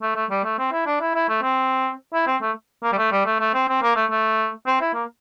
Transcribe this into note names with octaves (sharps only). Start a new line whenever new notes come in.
A3
A3
G3
A3
C4
E4
D4
E4
E4
A3
C4
E4
C4
A3
A#3
G3
A3
G3
A3
A3
C4
C4
A#3
A3
A3
C4
E4
A#3